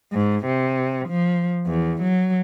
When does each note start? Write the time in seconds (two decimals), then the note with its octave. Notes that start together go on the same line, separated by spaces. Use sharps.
0.12 G#2
0.46 C3
1.08 F3
1.67 E2
2.02 F#3